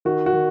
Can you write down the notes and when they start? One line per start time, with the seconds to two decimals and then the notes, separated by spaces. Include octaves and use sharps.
0.05 D#3 F#4
0.26 F#4
0.33 D#3